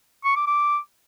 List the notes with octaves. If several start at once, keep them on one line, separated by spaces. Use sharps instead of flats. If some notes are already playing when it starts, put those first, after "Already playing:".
C#6
D6
D6